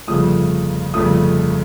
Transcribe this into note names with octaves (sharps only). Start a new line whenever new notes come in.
G1 F2 C#3 F3 A3 D#6
G1 F2 C#3 F3 A3 D#6